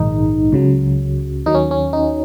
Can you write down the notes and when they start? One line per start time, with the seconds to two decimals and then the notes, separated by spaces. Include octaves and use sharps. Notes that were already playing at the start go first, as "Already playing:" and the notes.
Already playing: A#1 G#2 D#3 G#3 D#4
0.52 C#2 C#3 F#3
1.46 D#2 D#3 F#3 D#4
1.55 C#4
1.71 C#4
1.93 D#4